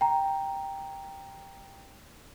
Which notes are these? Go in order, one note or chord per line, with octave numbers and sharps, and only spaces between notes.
G5 A#5